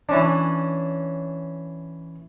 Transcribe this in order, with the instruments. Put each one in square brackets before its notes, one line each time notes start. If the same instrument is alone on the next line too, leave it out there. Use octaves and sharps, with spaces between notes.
[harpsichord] E3 C#4 D4